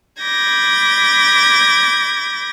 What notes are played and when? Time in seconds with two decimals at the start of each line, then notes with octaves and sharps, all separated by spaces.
0.21 B5 D6 G6 G#6 A#6